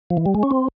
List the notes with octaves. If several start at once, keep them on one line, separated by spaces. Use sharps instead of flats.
F3
E3
G3
G#3
C#4
C4